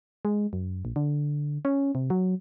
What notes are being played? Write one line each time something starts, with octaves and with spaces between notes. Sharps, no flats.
G#3
F#2
A#1
D3
C#4
C3
F#3